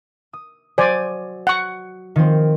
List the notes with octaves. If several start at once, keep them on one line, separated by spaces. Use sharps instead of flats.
D#6
F#3 C5 D5 G#5
F#5 C#6
D#3 F3 C4